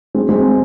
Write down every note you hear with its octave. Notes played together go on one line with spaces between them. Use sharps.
G#3 C4
G#3 C4